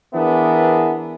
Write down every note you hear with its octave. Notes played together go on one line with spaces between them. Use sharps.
E3 B3 D4 G#4 A#4 E5